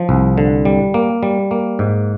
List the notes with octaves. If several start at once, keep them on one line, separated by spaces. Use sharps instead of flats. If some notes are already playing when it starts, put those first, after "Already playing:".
Already playing: F3
C2
D3
G3
A#3
G3
A#3
G#2